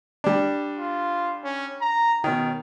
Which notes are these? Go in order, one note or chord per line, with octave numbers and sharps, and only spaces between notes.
G3 D4
F4
C#4
A#5
B2 D#3 C#4